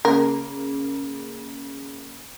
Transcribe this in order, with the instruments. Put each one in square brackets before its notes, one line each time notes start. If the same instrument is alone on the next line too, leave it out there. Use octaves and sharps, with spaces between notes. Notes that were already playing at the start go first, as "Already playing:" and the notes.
[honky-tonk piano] C#3 A#3 [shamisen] A#4